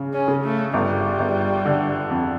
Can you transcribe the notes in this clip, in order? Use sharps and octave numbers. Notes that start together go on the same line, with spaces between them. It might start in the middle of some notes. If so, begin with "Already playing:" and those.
Already playing: C#3
C#4
C#3
A3
G1 G3
G1
D3
F2